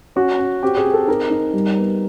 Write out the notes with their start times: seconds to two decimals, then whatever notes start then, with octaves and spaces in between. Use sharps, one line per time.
0.16 C#4 F#4
0.39 C#4
0.63 C4 G4
0.77 G#4
0.86 C4
0.93 A4
1.08 D#4 A#4
1.30 D#4
1.53 G3
1.77 B3